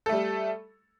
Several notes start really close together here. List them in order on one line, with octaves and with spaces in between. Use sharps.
A4 A3 G3